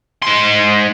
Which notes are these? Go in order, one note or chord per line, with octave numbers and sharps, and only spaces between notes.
G#2 C6